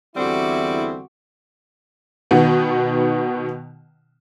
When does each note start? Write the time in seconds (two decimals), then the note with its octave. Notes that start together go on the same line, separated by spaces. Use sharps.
0.16 E2 D3 G3 C4 E4 F#4 D6
2.31 B2 D#3 B3